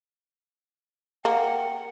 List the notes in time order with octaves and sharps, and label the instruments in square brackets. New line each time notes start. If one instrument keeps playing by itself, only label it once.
[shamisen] A#3 [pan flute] F#5 [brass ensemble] G5